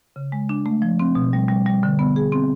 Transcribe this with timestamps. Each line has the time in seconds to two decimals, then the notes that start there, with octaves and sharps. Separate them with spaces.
0.16 C#3
0.32 G#3
0.49 D4
0.66 A3
0.82 F3
0.99 C4
1.15 B2
1.33 G3
1.49 G3
1.66 G3
1.83 D3
1.99 B3
2.16 G#4
2.32 C4